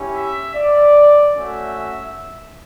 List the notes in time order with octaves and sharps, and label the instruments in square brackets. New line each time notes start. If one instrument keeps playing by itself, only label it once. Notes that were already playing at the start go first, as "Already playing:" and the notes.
Already playing: [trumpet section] C#4 E4 G4
E5
D5
A3 C#4 F#4 E5